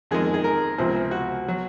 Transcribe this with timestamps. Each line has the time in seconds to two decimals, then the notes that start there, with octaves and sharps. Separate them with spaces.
0.11 F2 D#3 G#3 G#4
0.34 G#4
0.44 A#4
0.78 C#2 C3 F3 C4
1.11 F#4
1.48 F#3